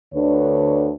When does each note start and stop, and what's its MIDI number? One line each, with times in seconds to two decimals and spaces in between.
0.13 0.91 38
0.13 0.91 50
0.13 0.91 62
0.13 0.91 71
0.13 0.91 73